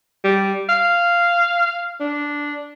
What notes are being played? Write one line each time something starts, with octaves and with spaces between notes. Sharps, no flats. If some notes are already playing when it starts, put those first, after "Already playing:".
G3
F5
D4